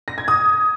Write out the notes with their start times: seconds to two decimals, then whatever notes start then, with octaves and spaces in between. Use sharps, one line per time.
0.08 A#6
0.18 G#6
0.28 D#6